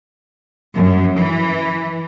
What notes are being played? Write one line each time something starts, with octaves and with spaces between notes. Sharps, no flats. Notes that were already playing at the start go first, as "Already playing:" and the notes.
F#2
E3